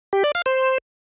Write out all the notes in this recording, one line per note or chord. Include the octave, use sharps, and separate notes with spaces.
G4
D5
F5
C5